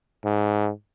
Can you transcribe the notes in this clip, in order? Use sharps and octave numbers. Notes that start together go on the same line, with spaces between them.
G#2